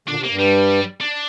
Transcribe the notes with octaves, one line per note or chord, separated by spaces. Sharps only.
A#2 D3 D4
C3
A#3
G2
G3
D4